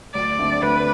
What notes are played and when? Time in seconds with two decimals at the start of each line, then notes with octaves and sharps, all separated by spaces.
0.14 D2 D5
0.39 D3 A3 C4
0.62 D2 B4